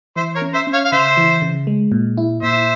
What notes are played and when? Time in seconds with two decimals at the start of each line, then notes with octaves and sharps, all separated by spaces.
0.16 E3 C5 E5
0.35 A#4 C#5
0.42 C#4
0.54 C5 E5
0.67 C#4
0.73 C#5 F5
0.85 F5
0.92 C#3 C5 E5
1.17 E3
1.42 C#3
1.67 G#3
1.92 A#2
2.17 E4
2.42 A#2 C5 E5